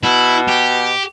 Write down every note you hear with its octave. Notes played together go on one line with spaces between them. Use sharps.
B2 E4
G4